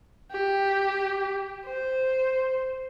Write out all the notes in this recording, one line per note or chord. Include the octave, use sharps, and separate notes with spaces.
G4
C5